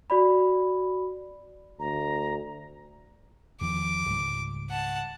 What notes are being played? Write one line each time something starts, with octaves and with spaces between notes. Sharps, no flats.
F#4 D5 B5
D2 A#5
E2 D#3 F3 D6
C#2 G#2 G3
F#5 A5